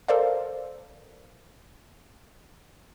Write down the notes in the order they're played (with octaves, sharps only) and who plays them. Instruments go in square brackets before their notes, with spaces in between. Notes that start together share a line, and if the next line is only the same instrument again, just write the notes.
[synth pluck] A4 A#4 C5 D5 F5